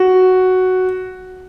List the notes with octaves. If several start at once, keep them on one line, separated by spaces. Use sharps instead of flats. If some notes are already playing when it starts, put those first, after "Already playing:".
Already playing: F#4